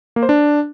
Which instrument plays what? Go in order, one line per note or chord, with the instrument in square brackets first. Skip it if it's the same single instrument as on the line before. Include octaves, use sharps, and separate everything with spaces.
[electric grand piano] A#3
C5
D4